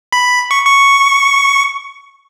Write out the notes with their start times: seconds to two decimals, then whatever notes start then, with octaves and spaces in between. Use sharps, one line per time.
0.13 B5
0.51 C#6
0.66 C#6